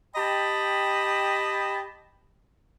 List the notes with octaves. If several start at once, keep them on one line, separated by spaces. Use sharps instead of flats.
G4 D#5 G5 A5 B5